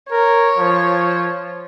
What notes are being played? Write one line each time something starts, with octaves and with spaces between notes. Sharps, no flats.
A#4 C#5
F3